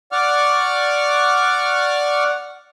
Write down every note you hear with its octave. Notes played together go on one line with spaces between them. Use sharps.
D5 F#5 C#6 D6 F6